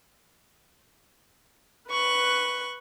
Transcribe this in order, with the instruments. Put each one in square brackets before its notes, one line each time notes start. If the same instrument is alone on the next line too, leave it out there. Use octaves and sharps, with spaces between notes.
[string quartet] B4 C#6 F#6